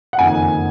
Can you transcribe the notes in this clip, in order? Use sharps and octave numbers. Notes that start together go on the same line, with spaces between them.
F#5
F#1 F2 D#3 G#5